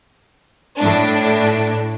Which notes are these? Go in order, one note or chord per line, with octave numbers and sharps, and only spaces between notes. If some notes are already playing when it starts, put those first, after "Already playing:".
A2 D4